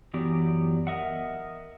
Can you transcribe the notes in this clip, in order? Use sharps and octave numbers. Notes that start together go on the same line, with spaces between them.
F#2 E3 F#3 B3 G4 D5
A#4 D#5 E5 F#5